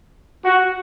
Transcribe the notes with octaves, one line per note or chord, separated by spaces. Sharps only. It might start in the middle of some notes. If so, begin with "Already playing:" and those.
F#4